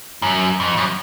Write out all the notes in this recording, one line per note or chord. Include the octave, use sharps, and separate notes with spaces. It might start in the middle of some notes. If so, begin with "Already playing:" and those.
F#2
F2
F#2